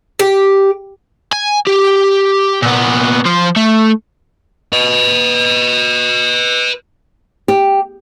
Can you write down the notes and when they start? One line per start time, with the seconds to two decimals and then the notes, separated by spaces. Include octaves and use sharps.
0.19 G4
1.33 G#5
1.67 G4
2.62 A#2 B3
3.26 F3 C5
3.56 A3
4.73 B4 D#5
7.48 G4